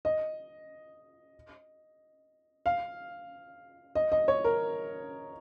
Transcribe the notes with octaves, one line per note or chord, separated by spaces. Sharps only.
D#5
F5
D#5
D#5
C#5
A#4